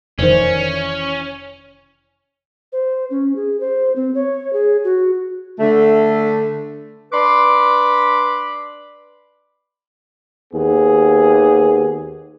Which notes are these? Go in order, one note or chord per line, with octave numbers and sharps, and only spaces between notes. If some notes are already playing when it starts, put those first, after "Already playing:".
F1 D#3 E3 C#4 C5 D5
C5
C#4
G#4
C5
C4
C#5
G#4
F#4
D3 A3
D4 B4 B5 C6 D6
D#2 B3 G#4